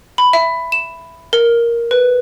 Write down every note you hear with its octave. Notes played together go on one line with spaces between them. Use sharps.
B5
E5
E7
A#4
B4